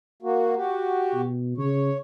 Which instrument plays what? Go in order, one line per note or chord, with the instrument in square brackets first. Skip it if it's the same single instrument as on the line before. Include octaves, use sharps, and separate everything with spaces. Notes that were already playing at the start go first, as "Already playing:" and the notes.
[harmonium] A#3 F#4
F#4 G4
[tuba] B2
[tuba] C#3 [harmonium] C#5